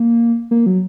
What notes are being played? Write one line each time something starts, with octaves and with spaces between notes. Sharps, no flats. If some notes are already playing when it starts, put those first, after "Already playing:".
Already playing: A#3
A#3
F#3